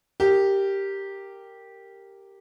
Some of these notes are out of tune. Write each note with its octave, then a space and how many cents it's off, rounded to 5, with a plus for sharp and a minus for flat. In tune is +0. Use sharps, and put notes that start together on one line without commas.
G4 +0 A#4 -10